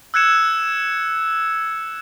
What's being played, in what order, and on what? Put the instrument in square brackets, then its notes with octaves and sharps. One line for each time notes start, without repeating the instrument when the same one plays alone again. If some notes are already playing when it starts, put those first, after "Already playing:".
[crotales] E6 F#6 G#6 C#7 E7